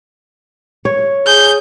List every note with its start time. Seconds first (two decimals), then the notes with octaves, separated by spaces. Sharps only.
0.85 C#5
1.27 G#4 G6